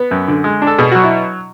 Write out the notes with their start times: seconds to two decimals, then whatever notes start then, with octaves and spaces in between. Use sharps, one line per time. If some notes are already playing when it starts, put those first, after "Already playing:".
Already playing: B3
0.11 F#2
0.28 D3
0.44 G#3
0.62 D4
0.67 A4
0.78 B2 G#4
0.92 F#3 F#4
1.04 E4